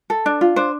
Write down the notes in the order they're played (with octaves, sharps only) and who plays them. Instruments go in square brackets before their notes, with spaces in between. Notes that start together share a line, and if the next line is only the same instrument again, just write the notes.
[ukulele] A4
D4
F4
D4 C5